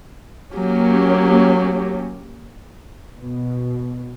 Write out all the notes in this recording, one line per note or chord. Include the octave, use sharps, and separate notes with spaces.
F#3 A#3 C#4 G4
B2